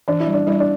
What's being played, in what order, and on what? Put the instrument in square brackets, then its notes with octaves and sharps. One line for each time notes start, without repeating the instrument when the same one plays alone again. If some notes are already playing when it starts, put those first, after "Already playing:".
[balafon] E3 [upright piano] D4
[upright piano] E4
[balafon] G3
[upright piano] D4
[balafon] G3 [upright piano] E4
[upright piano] D4